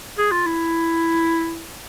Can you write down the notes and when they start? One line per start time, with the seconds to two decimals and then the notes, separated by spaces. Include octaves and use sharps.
0.18 G#4
0.32 F4
0.46 E4